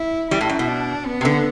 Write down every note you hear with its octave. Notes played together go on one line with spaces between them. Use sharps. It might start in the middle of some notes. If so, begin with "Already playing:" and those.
Already playing: E4
E3 G3 E4
A2
F#2
B2
D4
B3
C3
D3